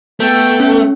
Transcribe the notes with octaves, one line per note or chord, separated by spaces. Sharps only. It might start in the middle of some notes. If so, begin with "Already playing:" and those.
A3 B3 G5
C#4